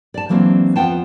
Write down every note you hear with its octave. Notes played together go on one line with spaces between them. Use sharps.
D5 A5
E3 F#3 A#3 C4 D4
F2 B3 F4 F#5 G5 A5